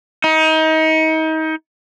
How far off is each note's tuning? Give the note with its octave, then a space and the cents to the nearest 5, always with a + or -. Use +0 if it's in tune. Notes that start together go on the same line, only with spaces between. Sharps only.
D#4 +30